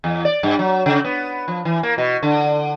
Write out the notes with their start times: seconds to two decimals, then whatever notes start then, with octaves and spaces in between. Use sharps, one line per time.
0.04 E2
0.25 D5
0.43 G2
0.59 F#3
0.86 C#3
1.04 B3
1.48 F3
1.65 E3
1.83 A#3
1.98 B2
2.23 D3